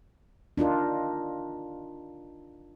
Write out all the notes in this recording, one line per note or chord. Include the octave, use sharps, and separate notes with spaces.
D4 D#4 F4 A#4